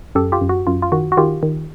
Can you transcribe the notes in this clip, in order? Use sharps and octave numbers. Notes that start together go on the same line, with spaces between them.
F#2 G4 A4
F4 G4
F#2
F#4
F#2 F4
F4
D#3 F#4
F#4
D#3 F4 G4
D#3